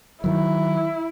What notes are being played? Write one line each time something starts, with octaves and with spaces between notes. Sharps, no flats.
D#3 F#3 E4